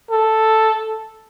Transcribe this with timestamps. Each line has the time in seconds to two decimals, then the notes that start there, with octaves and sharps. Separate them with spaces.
0.11 A4